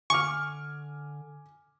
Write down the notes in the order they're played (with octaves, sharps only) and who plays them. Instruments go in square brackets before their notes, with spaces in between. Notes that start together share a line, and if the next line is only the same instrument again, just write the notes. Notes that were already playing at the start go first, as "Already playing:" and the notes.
[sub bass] D3 [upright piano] G#5 D6 F6 [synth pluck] C#6